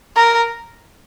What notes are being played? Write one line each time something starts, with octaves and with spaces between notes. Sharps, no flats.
A#4